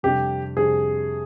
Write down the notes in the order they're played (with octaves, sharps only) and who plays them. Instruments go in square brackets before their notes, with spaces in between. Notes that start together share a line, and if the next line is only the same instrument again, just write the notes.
[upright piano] F2 C3 G3 D4 [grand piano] G4
[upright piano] F2 C3 G3 D4 [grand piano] G#4